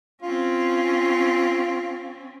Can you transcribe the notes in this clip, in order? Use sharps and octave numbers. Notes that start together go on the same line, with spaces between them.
C4 C#4 F4